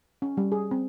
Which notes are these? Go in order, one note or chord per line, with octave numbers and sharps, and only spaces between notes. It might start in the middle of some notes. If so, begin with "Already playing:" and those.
C#4
G3
G#4
C4